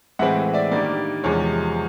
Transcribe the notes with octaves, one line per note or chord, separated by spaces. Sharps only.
A2 E3 G#3 C4 E5 F#5
D5 E5
G2 D#3 G3 A#3 D5
E2 C3 F3 G#3 C#5